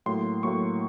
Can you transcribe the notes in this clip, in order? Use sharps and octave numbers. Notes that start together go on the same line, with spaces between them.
A2 F#3 A#3 C6
A2 F#3 A#3 C#6